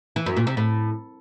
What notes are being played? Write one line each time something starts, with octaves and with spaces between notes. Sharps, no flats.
E3
F#2
A#2
C3
A2